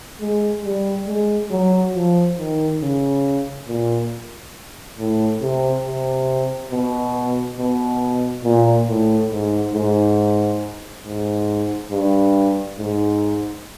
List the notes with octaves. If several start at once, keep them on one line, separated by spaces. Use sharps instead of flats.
G#3
G3
G#3
F#3
F3
D#3
C#3
A#2
A2
C3
C3
B2
B2
A#2
A2
G#2
G#2
G#2
G2
G#2